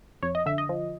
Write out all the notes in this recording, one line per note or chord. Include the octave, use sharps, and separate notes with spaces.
F2 C#5
D#5
D3 E5
D#5
F3